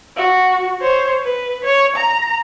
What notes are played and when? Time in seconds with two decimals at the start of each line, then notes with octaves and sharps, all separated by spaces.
0.16 F#4
0.81 C5 C#5
1.23 B4
1.64 C#5
1.96 A#5